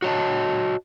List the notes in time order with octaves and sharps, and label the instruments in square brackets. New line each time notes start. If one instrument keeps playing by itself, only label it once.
[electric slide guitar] F#4 C#5 D#5 A5